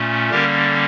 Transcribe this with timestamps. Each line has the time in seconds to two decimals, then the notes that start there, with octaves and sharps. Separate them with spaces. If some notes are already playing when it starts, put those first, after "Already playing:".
Already playing: A#2 A3 C#4
0.30 D3 G3 A#3 C#4 G4 A#4